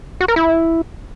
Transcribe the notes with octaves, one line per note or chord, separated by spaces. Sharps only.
F#4
A#4
E4